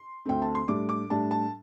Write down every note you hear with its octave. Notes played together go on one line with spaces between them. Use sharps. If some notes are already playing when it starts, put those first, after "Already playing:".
Already playing: C6
D2 D3 A3 C4 G5
A5
C6
A2 G3 D4 D6
D6
A2 G3 D4 A5
A5